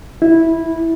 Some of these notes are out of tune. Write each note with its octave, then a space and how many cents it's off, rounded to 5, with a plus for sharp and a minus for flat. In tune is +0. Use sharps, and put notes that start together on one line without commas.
E4 -10